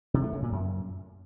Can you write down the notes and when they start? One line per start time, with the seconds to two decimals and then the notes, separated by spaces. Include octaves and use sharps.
0.14 C3
0.23 A3
0.33 C#3
0.42 A#2
0.52 F#2